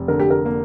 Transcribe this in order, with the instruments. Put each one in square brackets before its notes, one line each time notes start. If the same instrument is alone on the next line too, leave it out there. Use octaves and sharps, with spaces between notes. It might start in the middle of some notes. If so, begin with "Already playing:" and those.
Already playing: [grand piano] F1
[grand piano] D3 [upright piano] A#4
[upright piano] G4
A#4
[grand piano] A#3